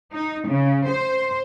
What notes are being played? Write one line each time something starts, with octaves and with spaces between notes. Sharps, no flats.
D#4
C#3
C5